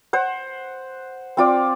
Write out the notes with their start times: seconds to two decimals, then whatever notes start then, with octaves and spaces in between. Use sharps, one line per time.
0.13 C5 F#5
1.37 C4 F4 D5